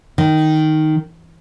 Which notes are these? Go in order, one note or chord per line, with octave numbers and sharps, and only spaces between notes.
D#3